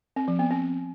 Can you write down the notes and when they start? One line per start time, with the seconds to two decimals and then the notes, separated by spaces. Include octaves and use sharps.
0.16 C4
0.28 F3
0.39 B3
0.51 C4